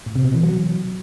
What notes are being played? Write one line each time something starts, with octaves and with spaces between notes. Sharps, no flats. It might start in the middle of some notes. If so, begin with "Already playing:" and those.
A2
C3
B2
E3
F#3